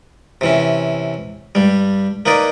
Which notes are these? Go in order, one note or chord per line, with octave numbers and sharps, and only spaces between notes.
C3 E3 C#4
G2 G3
A#3 D#4 B4 D5 D#5